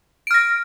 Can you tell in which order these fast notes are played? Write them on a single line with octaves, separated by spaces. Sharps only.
D7 F6 A#6